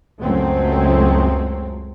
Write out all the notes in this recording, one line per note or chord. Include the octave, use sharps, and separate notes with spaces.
C#2 F#2 F#3 G#3 A3 C4